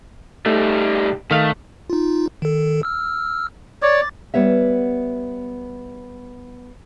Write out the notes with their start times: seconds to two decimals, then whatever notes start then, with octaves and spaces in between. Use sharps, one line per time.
0.46 G3 A3 D#4
1.31 D#3 A3 F5
1.90 D#4 F4
2.42 D#3 A4
2.83 E6 F6
3.82 C#5 D5 D6 A6
4.34 G3 B3 C#5 E5